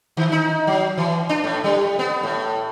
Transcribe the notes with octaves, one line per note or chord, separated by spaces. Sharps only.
D#3
D#4
F#3
E3
D4
A2
G3
B3
A2